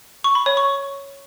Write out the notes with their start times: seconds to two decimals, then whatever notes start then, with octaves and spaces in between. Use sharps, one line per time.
0.24 C#6
0.35 B5
0.46 C#5
0.57 C#6